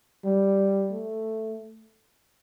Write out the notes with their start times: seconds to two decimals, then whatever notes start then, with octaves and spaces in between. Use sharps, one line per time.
0.25 G3
0.92 A3